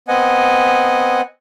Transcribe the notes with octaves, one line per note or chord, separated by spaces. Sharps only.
B3 C4 D#5 F#5 G#5